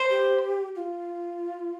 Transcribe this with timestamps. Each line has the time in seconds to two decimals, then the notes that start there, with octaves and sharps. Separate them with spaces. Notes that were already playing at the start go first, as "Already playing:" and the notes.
Already playing: C5
0.10 G4
0.76 F4